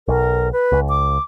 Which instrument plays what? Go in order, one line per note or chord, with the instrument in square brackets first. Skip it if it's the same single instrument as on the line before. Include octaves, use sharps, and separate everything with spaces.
[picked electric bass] B1 [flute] A#4
[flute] B4
[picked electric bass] C#2
[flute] D6